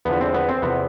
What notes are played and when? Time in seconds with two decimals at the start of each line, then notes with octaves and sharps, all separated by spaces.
0.05 E2 D3 F3 B3
0.21 C4
0.34 B3
0.48 C4
0.62 E2 C3 F3 B3